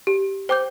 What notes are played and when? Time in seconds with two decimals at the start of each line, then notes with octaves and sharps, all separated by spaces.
0.07 G4
0.49 C5 G5 D6 G6